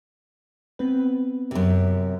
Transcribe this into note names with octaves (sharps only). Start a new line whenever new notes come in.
B3 C4 B4
F#2 C3